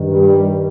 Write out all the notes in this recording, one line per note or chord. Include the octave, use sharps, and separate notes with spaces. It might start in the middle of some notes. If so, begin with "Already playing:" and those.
Already playing: G2 D#3
G3